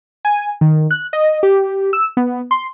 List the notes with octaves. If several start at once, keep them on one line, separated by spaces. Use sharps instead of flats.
G#5
D#3
F#6
D#5
G4
E6
B3
C6